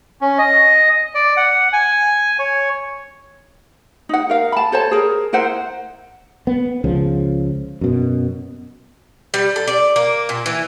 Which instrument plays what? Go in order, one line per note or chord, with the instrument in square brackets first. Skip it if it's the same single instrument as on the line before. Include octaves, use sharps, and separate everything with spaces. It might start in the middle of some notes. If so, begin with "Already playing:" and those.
[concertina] C#4
D#5
D5
F#5
G#5
C#5
[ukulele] D#4 F#5
A#4 F5
A5 B5
A4 C5 C#5 A5
G#4 A#4
E4 A#4 C5 F#5
[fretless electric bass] B3
C#2 C#3 F3
F#2 B2
[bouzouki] G3
A4
D5
A#3
A#2
E3